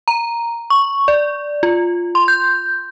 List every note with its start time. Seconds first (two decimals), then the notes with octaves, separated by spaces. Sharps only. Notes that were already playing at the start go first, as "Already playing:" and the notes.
0.08 A#5
0.70 C#6
1.08 D5
1.63 F4
2.15 C6
2.28 G6